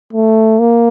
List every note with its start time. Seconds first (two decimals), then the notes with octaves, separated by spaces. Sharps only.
0.13 A3
0.59 A#3